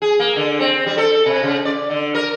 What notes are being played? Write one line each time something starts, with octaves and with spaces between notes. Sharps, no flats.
G#4
A#3
D3
C4
G3
A4
C3
C#3
D5
D3
A#4